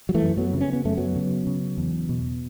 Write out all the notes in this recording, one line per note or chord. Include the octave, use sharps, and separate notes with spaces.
F#3
E3 A3
F#2
F#3 B3
C#3
C#4
B3
F#2 A3
F#3 B3
C#3
C#3
E2
B2